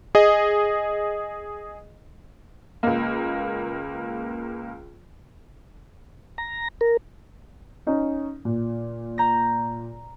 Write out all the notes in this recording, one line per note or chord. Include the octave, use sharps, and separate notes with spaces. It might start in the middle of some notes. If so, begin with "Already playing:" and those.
G#4 D#5
C#2 A#3
A#5
A#4
C#4 D#4
A#2
A#5 G6 A#6